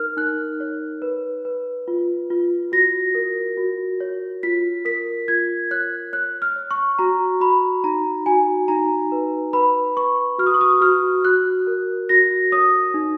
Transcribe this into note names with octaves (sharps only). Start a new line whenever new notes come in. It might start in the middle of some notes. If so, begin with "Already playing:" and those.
Already playing: D#4 A#4 F6
D#4 F#6
C#5
B4
B4
F4
F4
F#4 A#6
A#4
F#4
C#5
F4 B6
A#4 B6
F4 G#6
C#5 F#6
C#5 F#6
F6
C#5
C#6
F#4 A#5
F#4 B5
D#4 A#5
F#4 G#5
D#4 A#5
B4
B4 B5
B4 C#6
F#4 F6
D#6
C#6
D#6
F#4 F6
F#4 F#6
A#4
F#4 A#6
C#5 D#6
D#4